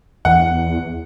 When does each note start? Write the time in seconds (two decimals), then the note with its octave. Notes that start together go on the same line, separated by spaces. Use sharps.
0.25 E2 F#5